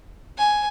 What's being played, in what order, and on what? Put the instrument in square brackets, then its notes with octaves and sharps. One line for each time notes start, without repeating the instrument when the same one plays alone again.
[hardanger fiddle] G#5